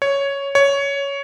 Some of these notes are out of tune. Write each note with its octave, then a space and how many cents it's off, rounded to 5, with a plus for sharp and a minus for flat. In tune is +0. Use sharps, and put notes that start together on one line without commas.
C#5 +5
C#5 +10